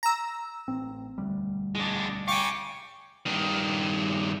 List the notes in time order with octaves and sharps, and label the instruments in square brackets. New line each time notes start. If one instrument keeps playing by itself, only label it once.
[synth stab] A#5 E6
[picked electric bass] A1 C4
E1 D2 G3
[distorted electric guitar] G#3 D4
[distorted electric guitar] F5 G#5 [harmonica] G5 C#6 D6
[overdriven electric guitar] G2 D#3